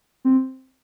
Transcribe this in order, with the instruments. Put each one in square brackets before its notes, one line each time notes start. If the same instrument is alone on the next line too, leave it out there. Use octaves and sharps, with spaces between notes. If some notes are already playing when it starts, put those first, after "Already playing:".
[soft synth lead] C4